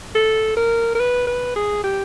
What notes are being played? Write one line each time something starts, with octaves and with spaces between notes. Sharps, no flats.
A4
A#4
A#4
B4
B4
G#4
G4